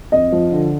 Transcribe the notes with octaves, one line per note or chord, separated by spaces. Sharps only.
F2 D#5
F3
D3